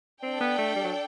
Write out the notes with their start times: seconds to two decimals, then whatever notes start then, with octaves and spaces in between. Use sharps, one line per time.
0.23 C4 D4 A4 D5 G5
0.40 B3
0.58 A3
0.75 G3
0.84 F#3